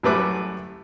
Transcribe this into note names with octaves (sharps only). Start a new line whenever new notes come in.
A1 F#2 G3 A3 B4 D6